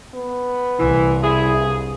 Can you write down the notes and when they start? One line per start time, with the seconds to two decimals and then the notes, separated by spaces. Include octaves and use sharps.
0.14 B3
0.79 C2 E3
1.22 E4 G#4
1.57 G2